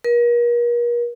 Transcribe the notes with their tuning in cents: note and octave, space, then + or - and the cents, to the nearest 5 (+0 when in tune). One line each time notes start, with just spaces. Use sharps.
A#4 +40